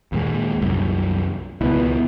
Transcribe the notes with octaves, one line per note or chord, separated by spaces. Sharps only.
D#2 A#2 G#3
C2 F#2
C#2 B2 B3 E4